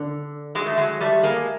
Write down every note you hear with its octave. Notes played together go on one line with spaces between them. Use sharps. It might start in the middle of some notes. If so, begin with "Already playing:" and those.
Already playing: D3
F#3 G#3
A3
F#3 G#3
G3 A3
G#3 A#3